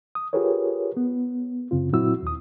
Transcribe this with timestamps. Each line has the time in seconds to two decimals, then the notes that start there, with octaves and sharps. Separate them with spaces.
0.15 D#6
0.33 F4 G4 G#4 A#4 B4 C#5
0.97 B3
1.71 F#2 C#3 C4 F4
1.93 A#2 F#3 C4 E4 F#4 E6
2.23 D#2 D#6